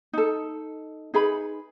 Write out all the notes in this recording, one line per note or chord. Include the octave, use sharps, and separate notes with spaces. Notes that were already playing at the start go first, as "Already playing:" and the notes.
D#4 A4
D#4 G#4 B4 B5